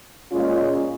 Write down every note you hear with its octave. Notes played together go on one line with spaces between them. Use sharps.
A#2 G#3 C#4 F4